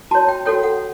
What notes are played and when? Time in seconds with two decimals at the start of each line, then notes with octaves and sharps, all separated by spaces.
0.11 F#4 C#5 A5
0.28 G5
0.46 F#4 A4 C#5 G5
0.63 F#5